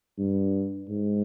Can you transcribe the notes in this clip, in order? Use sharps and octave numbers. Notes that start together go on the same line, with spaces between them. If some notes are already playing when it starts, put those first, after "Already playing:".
G2
G#2